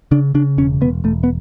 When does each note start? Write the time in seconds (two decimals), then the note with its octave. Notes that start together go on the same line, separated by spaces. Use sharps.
0.11 C#3 D4
0.35 C#3 D4
0.58 E1 C#4
0.81 E1 B3
1.04 E1 A3
1.23 B3